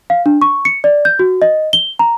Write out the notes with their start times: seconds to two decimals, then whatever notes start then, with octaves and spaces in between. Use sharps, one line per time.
0.10 F5
0.26 D4
0.42 C#6
0.65 C#7
0.84 D5
1.05 G6
1.19 F#4
1.42 D#5
1.73 G7
1.99 A#5